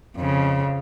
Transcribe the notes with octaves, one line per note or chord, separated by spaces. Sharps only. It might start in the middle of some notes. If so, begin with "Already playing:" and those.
F2 C#3